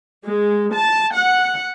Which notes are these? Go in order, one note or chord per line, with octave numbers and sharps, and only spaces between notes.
G#3
A5
F#5